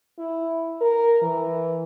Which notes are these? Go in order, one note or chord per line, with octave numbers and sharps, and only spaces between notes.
E4
A#4
E3